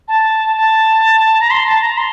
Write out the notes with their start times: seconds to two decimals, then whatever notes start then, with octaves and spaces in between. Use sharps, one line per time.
0.08 A5
0.56 A5
1.41 A#5
1.51 C6
1.66 A5
1.82 A#5
1.98 C6